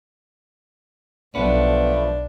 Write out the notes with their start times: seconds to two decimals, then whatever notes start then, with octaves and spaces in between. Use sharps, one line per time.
1.35 B1 F3 A3 B3 D4